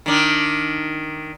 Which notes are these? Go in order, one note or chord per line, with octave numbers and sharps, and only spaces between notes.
D#3 D4